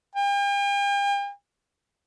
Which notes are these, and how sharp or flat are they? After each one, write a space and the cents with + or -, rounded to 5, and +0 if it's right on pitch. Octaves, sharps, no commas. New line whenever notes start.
G5 +45